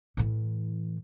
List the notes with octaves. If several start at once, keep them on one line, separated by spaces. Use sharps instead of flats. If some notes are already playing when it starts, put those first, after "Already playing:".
A2 E3